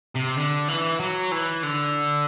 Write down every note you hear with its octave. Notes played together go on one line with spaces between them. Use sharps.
C3
D3
E3
F#3
E3
D3